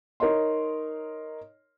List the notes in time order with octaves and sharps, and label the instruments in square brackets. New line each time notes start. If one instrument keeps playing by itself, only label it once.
[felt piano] D#4 A#4 C#5 D#5 C6